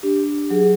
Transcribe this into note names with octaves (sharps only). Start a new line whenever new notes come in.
D4 G4
F#3 G#4